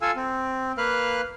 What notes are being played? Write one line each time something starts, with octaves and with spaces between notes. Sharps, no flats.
F4 A4 F5 G#5 E6
C4
A#3 B4 F5 F6 F#6